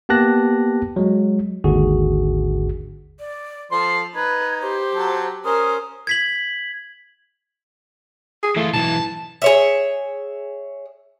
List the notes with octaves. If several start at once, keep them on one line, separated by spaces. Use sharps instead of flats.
A#3 B3 G4 A5 F#6 A#6
F#3 G#3
G#1 D#2 G#2 D3 F#4 G#4
D5
F3 A4 C5 C6
D#4 B4 G#6
G4 C5
F#3 A4
C#4 A#4 C5 D#6
G#6 B6 F#7
G#4
E3 A3 F4
B1 E3 A5
G#4 C#5 E5